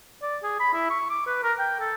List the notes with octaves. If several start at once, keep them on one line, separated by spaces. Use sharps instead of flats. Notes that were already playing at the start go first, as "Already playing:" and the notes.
D5
G#4
B5
E4
C#6
D6
B4
A#4
G5
A4